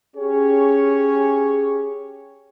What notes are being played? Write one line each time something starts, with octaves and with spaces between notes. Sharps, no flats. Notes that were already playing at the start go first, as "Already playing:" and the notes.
C#4 G4 G#4 C#5